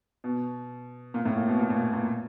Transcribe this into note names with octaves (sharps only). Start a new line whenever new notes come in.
B2
A#2
A2
A#2
B2
A#2
A#2
A#2